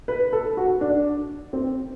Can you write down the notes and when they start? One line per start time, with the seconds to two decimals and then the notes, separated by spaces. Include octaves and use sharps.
0.08 B4
0.33 A4
0.57 F#4
0.81 D4
1.53 C4